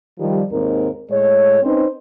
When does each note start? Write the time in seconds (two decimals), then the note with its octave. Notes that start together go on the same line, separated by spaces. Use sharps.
0.19 D#3 F3 G3
0.51 D#2 G#2 C4 D#4 A#4
1.11 A2 G#3 C#5
1.63 C4 C#4 D#4 B4 C5